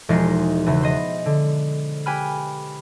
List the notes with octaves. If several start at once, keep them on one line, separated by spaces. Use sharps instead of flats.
E1 F3 G#3 D#4 C6 C7
E2 C#3 E3
C5 D#5
D3
G4 B4 G5 G#5 B5 F6